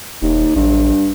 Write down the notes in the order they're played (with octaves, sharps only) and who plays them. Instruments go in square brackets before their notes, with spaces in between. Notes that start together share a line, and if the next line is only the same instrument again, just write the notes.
[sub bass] E1 [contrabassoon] D#2
[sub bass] A1 [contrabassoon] G2